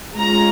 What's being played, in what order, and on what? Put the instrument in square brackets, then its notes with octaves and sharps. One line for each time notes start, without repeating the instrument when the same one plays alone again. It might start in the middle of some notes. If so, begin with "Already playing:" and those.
[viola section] G#3 C#4 F4 A#5